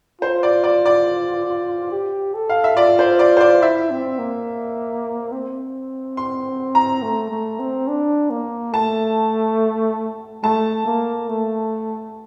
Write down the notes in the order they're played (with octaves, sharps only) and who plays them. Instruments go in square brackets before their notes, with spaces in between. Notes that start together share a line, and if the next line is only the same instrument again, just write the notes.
[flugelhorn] F4 [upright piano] C5
[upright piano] D5
D5
D5
[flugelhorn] G4
A4
[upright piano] F5
E5
[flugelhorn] F4 [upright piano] D5
[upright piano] C5
D5
C5
D5
[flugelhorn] E4 [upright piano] E5
[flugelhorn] C4
A#3
C4
[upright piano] C6
A#5
[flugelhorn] A3
A3
C4
D4
A#3
[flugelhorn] A3 [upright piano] A5
[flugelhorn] A3 [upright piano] A5
[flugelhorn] A#3
A3